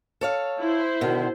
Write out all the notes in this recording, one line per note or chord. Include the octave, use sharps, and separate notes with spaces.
A4 C#5 F5
E4 C5
B2 D3 D#3